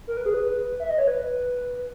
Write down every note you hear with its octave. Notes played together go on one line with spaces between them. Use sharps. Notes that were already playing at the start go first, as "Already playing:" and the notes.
A#4
B4
G#4
B4
E5
D#5
C#5
B4